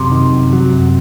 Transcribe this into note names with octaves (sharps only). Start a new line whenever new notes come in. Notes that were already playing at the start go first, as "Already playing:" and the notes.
Already playing: F#2 C3
D#3
F#2
F#3
F#2